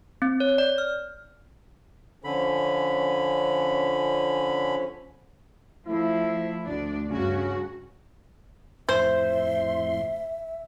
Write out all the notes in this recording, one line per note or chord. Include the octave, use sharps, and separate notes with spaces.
C4
C#5
D5
F6
D3 F3 C#4 B5
F3 A3 E4
D2 D4 D5
G2 C#3 C#4 F#4
F2 A2 C5 E5 C6